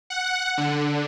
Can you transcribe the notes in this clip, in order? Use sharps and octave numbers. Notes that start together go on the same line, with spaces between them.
F#5
D3